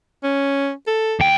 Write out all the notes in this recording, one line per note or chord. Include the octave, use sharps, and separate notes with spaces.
C#4
A4
D#2 G5